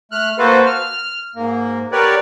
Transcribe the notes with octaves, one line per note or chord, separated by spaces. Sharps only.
A3 F6 F#6
A#3 F#4 A4 B4 C5
F6
G#2 A#3
B3 G4 A#4 B4 C#5 D5